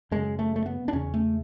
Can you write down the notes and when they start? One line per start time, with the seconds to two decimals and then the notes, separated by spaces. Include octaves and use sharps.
0.11 F#2 C#3 G#3
0.39 A3
0.56 A3
0.66 B3
0.88 D4
0.93 E2 C#3 C#4
1.14 A3